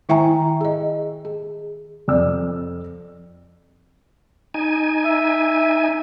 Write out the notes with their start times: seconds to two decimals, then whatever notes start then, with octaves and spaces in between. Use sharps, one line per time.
0.09 D#3 E4 E5 G5 G#5 A#5
0.61 G#4 D#5
1.25 G#4
2.08 F2 D5 E6
4.54 D#4 G#5
5.05 E5